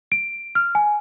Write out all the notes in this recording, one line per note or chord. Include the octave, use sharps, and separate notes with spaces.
D7
F6
G#5